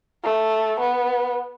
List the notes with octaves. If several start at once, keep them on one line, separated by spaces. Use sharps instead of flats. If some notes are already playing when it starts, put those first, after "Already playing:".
A3
B3